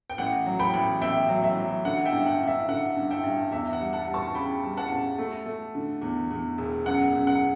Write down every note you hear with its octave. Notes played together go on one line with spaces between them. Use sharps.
G5
A1 F#5
F#3
G5 B5
A1
A1 E5 G5
F#3
E5
F#3
D3 F#5
E5 G5
G2
F#5
G2
E5
D3 F#5
G2
E5 G5
G2
E2 E5
F#5
G3
F#5 A5
G3
A5 C#6
C#3 G5 B5
G3
F#5 A5
C#3
A3
A3
D3
E2
E2
E1
F#2 F#5
F#2
F#5